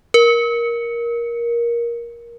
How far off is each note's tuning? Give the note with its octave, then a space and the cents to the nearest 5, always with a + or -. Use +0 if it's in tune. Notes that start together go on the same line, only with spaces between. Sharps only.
A#4 +15